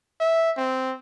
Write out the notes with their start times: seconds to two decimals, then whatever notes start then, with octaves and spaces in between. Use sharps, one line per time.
0.21 E5
0.58 C4